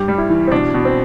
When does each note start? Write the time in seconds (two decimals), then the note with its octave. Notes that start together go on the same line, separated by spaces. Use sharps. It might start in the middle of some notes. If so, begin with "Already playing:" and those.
Already playing: G2 G4
0.08 G3
0.18 E4
0.30 E3
0.47 C4
0.52 B2 D4
0.74 B2
0.85 C4